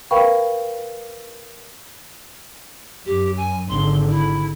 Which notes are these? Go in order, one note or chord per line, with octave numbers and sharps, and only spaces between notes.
A#4 B4 F5 G5 B5 C#6
F#2 G4
G#5
G#1 D3 C6
E4